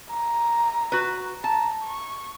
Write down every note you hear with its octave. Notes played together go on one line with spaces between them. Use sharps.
A#5
F#4 B4
A5 A#5
C#6